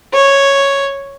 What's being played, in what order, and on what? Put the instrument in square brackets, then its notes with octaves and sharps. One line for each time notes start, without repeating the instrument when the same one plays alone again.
[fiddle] C#5